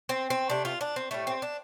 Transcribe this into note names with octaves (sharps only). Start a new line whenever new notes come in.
C4
C4
C3 A3 D4
F4
D4
C4
A2 G3 A3
C4
D4